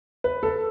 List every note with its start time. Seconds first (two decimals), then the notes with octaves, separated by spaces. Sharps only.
0.24 B4
0.43 A4